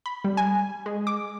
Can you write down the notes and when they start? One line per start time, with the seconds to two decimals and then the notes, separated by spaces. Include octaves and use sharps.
0.06 B5
0.24 G3
0.37 G#5
0.86 G#3
1.07 D6